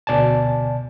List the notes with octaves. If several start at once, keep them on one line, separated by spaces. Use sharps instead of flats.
D2 B2 D5 G#5 A5